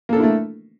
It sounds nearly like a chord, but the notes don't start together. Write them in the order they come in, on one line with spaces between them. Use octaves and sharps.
A#3 A4 D4 E4 A3